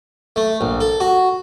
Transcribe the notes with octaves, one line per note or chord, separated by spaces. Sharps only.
A3
A#1
A4
F#4